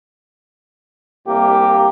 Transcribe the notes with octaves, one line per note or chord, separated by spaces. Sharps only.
C2 A#3 G4